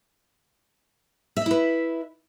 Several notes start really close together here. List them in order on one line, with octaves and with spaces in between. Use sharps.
E5 D#5 E4 B4